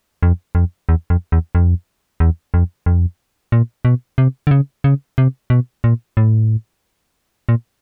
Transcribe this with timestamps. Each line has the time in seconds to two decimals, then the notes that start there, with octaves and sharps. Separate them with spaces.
0.23 F2
0.55 F2
0.89 E2
1.10 F2
1.32 E2
1.55 F2
2.20 E2
2.54 F2
2.86 F2
3.52 A#2
3.85 B2
4.18 C3
4.47 D3
4.51 C#3
4.84 C#3
5.18 C3
5.50 B2
5.84 A#2
6.17 A2
7.49 A#2